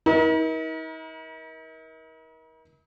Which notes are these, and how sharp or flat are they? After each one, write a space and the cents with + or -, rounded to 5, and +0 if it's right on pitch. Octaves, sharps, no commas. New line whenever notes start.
D#4 +45 A#4 +35